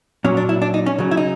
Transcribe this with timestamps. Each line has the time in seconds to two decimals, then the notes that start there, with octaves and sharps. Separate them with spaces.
0.24 A#2 F#3 C#4
0.37 D4
0.49 E4
0.62 D4
0.74 D#4
0.86 C#4
0.98 C#3 F#3
1.11 E4
1.17 D#4